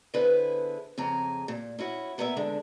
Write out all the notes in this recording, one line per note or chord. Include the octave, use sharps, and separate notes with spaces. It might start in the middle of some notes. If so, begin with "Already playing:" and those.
D3 B3 E4 G#4 B4 C5
F2 C#3 G#4 A#5
A#2
C#4 E4 F#4
A#2 B3 A#4 B4 E5
E2 D3 G#3 D4